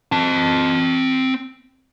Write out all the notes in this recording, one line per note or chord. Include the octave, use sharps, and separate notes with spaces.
C4 A5